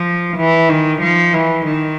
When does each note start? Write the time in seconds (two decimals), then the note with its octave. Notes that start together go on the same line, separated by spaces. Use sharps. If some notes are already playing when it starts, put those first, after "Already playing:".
Already playing: F3
0.37 E3
0.69 D#3
1.02 F3
1.33 E3
1.66 D#3